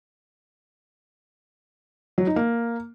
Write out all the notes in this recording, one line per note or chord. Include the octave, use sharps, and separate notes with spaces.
F#3
D#4
A#3